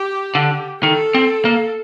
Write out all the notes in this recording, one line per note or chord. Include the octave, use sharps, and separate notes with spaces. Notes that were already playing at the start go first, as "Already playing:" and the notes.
Already playing: G4
D3
D#3 A4
C4
A#3